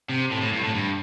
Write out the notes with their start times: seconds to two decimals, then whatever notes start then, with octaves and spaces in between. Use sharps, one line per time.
0.09 C3
0.31 A2
0.42 A2
0.53 G2
0.63 A2
0.75 G2